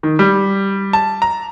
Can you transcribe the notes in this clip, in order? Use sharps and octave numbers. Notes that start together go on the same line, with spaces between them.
D#3
G3
A5
A#5